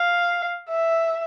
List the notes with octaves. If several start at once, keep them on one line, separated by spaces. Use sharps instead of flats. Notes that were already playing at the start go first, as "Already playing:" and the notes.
Already playing: F5
E5